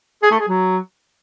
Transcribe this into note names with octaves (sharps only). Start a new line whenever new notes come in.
G#4
A3
G#4
F#3